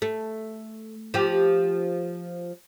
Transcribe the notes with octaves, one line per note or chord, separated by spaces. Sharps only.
A3
F3 G4